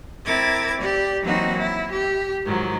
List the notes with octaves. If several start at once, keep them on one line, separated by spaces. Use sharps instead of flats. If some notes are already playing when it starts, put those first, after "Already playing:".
C4 E4 A#4 D6 G#6 A6
G4 D5
E3 F#3 A#3 C4 D#4 F#4
E4
G4
G#2 D#3 F3 F#3